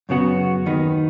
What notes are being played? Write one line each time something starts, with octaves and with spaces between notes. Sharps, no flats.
F#2 C#3 B3 F#4
D#2 D#3 B3 D#4